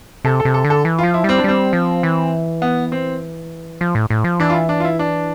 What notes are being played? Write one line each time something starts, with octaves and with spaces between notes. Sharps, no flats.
C3 A4
A4
C3
A4
D3
A4
E3
F3 F4
E4
G3 C4
D4
G3 C4
F3
E3
B3
C4
F3
A2
A2
F3
E3 D4
F4
E4
D4
F4
E4
D4